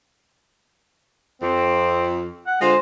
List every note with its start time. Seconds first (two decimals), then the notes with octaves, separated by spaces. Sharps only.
1.42 F2 C4
2.47 F#5
2.61 D3 G#3 F4 C5